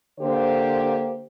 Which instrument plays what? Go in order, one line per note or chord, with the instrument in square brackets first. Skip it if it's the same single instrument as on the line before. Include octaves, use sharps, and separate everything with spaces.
[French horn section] D3 A#3 G4 C5